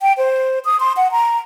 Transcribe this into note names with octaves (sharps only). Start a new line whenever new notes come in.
G5
C5
D#6
C6
F#5
A#5